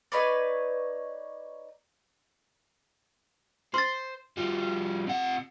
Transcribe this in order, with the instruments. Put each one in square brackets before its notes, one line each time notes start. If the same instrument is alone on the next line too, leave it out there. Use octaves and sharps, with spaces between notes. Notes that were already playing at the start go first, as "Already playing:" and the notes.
[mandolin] D#4 B4 C#5 D5
[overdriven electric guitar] C5 [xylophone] C6 A6
[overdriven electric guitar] F3 G3
C3 F#5